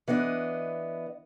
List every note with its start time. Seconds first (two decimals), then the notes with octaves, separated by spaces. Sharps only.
0.08 E3 B3 D4 D#5